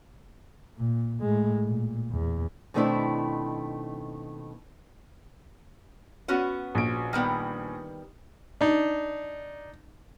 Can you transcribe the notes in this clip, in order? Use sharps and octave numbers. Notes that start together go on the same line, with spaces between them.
A#2
A2 G#3
A#2
E2
B2 D#3 A3 C4 D4 E4
B3 C#4 F#4
A#1 D7
D#3 G3 B3
D4 D#4